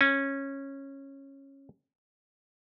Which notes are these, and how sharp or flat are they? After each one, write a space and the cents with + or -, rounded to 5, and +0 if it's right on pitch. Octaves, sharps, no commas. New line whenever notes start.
C#4 -15